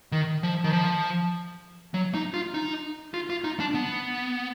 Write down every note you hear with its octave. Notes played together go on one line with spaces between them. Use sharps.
D#3
F3
D#3
F3
F#3
D#4
F4
D#4
F4
F4
D#4
D4
B3